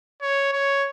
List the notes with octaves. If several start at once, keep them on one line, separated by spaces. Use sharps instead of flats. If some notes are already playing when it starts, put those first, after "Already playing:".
C#5
C#5